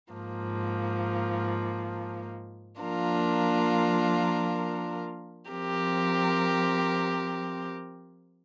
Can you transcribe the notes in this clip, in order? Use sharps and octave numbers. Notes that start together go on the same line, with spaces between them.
G#2 F3 A#3
F3 A#3 D4 F4 A#4
F3 C4 G4 A#4